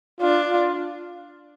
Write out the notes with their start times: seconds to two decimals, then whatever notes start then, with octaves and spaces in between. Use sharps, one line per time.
0.20 D4 F4
0.51 F4